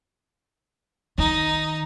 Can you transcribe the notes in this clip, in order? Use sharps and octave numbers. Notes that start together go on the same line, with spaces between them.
D#3 D#4